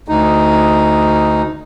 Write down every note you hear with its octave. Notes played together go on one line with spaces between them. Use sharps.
D2 D#4